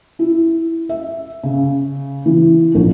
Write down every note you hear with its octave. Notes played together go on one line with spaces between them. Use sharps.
E4
E5
C#3
E3
A#1